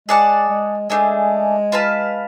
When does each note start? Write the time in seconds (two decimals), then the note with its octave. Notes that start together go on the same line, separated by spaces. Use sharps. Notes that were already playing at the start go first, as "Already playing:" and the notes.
0.08 G#3 G#4 D5 F#5 A5
0.49 G#3
0.90 G#3 A3 D4 G#4
1.72 F4 B4 F5 A5